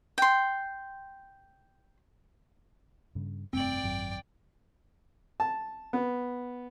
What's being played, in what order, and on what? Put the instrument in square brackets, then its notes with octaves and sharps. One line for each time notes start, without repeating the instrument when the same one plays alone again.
[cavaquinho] G5 C6
[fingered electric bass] G2 C#3
[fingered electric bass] F1 G2 A3 [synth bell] C4 F#7 [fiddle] D5 G5
[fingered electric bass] G#1 F#2 F#3
[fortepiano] A5
B3